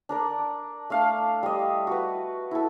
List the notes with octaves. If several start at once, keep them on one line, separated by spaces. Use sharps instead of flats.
D4 A#4 D5
A3 D4 F5
G3 D#5
F#4 B4
E4 A4